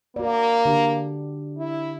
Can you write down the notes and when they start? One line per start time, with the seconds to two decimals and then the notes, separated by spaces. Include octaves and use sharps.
0.16 A#3 F#4 D5
0.65 D3 D4 G4
1.58 E4